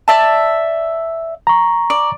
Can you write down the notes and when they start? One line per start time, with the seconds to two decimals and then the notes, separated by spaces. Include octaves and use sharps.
0.08 D5 E5 A5
1.47 A#5 C#6
1.90 D5